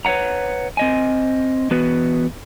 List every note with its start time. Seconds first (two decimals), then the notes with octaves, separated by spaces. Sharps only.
0.05 B4 C#5 D5 F#5 A#5
0.77 C4 D#5 G#5
1.71 E3 B3 F#4 B4